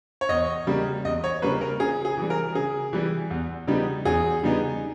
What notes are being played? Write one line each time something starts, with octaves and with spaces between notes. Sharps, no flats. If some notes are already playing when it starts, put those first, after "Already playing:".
C#5
E2 D#5
C#3 G3 A#3
E2 D#5
C#5
C#3 G3 A#3 B4
A#4
C#3 G#4
G#4
E3 G3
A#4
C#3 G#4
E3 G3
E2
C#3 G3 B3 D#4
E2 G#4
C#3 G3 B3 D#4